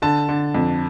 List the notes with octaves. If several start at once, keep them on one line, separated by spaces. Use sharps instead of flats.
D3 A5
D3
F2